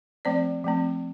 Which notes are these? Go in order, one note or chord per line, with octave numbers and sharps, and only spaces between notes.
F3 A3 C4 C5 D5
F3 A3 C4